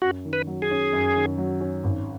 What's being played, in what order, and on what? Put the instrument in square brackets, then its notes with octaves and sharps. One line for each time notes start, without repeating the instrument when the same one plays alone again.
[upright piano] F#2 [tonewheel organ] F#4
[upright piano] D#3
[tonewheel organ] B4
[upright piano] F#3
[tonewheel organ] G#4
[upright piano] C#4
F#2
D#3
F#3
C#4
G#1